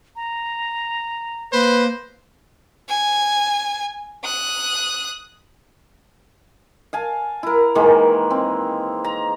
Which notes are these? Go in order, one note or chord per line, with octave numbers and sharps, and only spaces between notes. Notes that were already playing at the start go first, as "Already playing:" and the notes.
A#5
A#3 B4 C5
G#5
D#6 F#6
F5 G#5 A5
E4 A#4
D#3 E3 G#3 A#3
C4
A#5